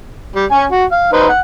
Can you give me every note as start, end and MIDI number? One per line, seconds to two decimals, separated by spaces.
0.35 0.45 55
0.51 0.65 61
0.51 0.65 80
0.71 0.84 66
0.91 1.10 77
1.13 1.27 63
1.13 1.27 71
1.13 1.27 72
1.29 1.40 78